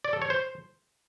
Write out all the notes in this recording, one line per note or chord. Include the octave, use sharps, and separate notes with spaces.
D5
A4
C#5
C5